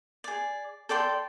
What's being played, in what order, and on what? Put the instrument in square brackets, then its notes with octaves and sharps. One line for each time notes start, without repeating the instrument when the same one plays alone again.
[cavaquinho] G#4 D5
A4 D5 G5 C6